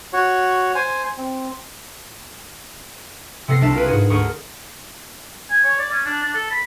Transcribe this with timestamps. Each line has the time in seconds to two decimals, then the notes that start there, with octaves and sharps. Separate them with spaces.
0.13 F#4 C#5
0.75 C5 G#5
1.18 C4
3.48 C3 B3 A4 A#6 C7
3.61 C2 D4 E5 A5 E7
3.73 F4 A#4 B4
3.86 G#2 F#4 G#4
4.10 D2 A#4 C#6 D#6
5.50 G#5
5.64 C#5
5.79 D5
5.91 C#4
6.06 D4
6.23 D4
6.34 A4
6.51 B5